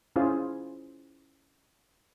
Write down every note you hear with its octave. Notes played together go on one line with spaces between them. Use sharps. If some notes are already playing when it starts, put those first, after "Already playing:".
C#4 E4 F4 G#4 C5